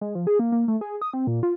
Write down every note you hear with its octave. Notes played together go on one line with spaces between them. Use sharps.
G#3
F3
G#4
A#3
A#3
A3
G#4
D#6
C4
A#2
F4